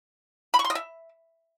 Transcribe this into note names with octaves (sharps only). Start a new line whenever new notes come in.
B5
C#6
C6
D#5
E5